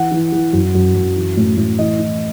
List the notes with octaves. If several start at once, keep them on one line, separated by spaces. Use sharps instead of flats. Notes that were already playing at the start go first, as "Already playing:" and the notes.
Already playing: E3 F#5
E3
E3
F#2
F#2
F#2
E3
A2
A2
E3 D#5
E3